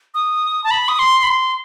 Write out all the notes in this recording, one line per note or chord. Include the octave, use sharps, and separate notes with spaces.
D#6
A5
B5
D#6
C6
B5
C6